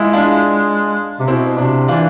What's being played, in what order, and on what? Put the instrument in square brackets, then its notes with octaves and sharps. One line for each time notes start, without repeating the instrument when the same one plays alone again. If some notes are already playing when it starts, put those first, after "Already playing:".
Already playing: [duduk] G#3 [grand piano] E4 F4 G#4
[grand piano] D4 F4
[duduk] C3
[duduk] B2 [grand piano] C4 E4
[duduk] C3 [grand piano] D4
[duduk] E3 [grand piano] D4 F4